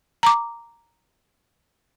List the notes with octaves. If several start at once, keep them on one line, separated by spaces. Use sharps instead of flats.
A#5 D6